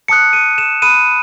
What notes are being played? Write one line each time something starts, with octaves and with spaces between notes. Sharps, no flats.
A5 D#6 F#6 C#7
D#7
E7
B5 D#6 F#6 D#7